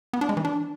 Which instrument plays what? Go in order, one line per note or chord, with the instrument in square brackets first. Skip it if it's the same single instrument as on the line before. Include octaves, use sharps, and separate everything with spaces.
[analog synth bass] B3
D4
G#3
E3
D4